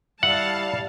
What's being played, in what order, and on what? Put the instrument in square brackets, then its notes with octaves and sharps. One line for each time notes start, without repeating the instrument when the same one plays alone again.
[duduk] G3 [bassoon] E4 [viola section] F5 A5 [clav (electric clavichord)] F#5